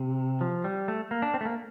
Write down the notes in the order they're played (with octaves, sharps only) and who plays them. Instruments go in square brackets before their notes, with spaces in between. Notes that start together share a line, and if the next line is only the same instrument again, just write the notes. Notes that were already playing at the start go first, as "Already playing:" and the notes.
Already playing: [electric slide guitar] C3
F3
G3
A3
A#3
D4
C4
A3
A#3